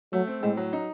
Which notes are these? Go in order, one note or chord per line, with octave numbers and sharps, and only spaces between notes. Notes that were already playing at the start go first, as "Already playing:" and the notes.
F#3 A3
C4
A2 G#3
F#3
D#4